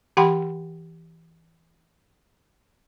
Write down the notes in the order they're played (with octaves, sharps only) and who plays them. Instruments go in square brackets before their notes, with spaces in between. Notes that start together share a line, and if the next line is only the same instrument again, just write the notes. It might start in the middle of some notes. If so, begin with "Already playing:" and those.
[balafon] E3 G4 F#5 G5 B5 C6